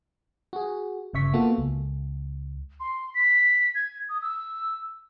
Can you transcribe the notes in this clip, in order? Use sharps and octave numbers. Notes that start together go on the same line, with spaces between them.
F#4 G#4
G1 C#3 E5 C#6 B6
A#3 B3 F4 F#4 A4
C#2
C6
B6
G#6
D#6
E6